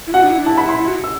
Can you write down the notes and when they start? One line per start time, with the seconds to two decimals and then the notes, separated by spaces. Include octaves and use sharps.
0.07 E4
0.13 F#4 F#5
0.23 D4
0.30 E4
0.39 D4
0.46 E4 A5
0.58 B5
0.63 E4
0.69 C6
0.79 E4
0.88 F#4
1.04 E6